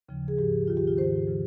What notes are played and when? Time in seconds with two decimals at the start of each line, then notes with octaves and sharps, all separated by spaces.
0.09 D#2 C#3 F3
0.28 G#4
0.38 G#2 F3 G4
0.68 D#2 D#3 F4
0.77 G4
0.87 F4
0.97 G#2 D#3 C5
1.27 C#3 F3